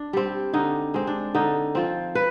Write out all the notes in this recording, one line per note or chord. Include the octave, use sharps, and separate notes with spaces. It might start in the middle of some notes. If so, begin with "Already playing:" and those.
Already playing: D4
G3 C4
D3 D#4
G#3 C4
D4
D3 D#4
F3 C4
B4